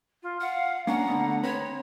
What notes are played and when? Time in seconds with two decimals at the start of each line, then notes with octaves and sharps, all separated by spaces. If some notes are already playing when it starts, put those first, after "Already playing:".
0.22 F4
0.41 F5 F#5
0.87 A#3 C#4 D4 F#5 A#5
1.08 D3 A3 B3
1.43 C4 B4 C#5